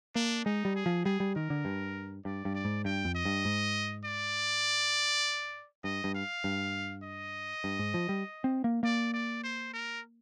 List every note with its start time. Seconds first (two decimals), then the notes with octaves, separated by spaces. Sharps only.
0.15 A#3 D4
0.45 G#3 D#4
0.65 G3
0.75 G#4
0.86 F3
1.05 G3 G#4
1.20 G3
1.35 D#3 A#4
1.50 D3
1.65 G2
2.25 G2 D5
2.45 G2
2.55 D5
2.65 G#2
2.85 G2 G5
3.05 F2
3.15 D#5
3.25 G2
3.45 G#2
4.05 D5
5.84 G2 D#5
6.04 G2
6.15 F5
6.44 G2
7.03 D#5
7.64 G2
7.79 G#2
7.94 F3
8.09 G3
8.44 C4
8.64 A#3
8.83 A#3 D5
9.14 D5
9.44 C5
9.73 A#4